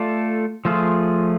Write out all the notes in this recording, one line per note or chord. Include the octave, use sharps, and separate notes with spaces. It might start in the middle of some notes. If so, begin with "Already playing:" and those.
Already playing: A3 F4 A4 D5
F3 A3 F4 G#4